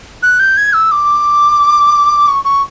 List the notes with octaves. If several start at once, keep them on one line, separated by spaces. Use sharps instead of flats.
F#6
G6
G#6
E6
D6
C#6
C#6